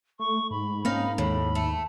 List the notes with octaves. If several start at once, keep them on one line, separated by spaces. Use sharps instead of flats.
A3 C#6
G#2 B5
A#3 C4 C#4 D#4 F5
D#2 A2 B5
A3